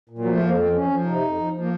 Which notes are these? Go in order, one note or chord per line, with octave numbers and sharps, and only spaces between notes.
A#2
F#3
F3 A3
F2 A#3
F3 C4
F3 C#4
F3
C3 D#4
F2
F3
F3
A#3